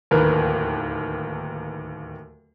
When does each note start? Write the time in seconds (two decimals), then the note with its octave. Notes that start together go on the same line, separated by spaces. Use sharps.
0.11 D1 D#2 A#4 B4